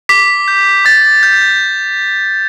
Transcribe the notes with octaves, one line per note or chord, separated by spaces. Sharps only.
D6 B6
G6
D6 A6
G6